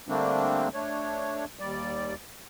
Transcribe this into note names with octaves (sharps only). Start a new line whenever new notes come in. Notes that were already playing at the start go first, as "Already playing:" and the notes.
D3 G3 A3 A#3 C4 D4
A3 D4 C#5
D#2 G3 D5